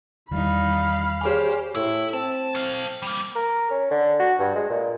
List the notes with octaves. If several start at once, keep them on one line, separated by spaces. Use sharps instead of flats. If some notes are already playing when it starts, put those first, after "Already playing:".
E2 D#3 E3 G3 D#4 F5 B5
G4 G#4 C5 C#5 G#5
A2 E4
C4 A5
A4 F5
G3 A#3
A#4
C#4
D3
F#4
G2
G#3
A#2